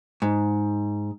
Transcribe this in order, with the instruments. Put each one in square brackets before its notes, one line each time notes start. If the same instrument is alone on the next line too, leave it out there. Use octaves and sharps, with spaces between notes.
[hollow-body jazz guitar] G#2